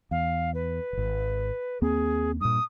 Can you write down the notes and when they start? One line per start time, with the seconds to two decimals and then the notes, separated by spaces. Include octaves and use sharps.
0.11 E2 F5
0.54 B4
0.93 D#1 G#1
1.82 D#2 A#3 C4 G#4
2.41 G2 A#2 D#6